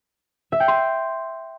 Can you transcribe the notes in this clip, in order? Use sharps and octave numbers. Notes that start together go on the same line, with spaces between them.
E5
G5
C6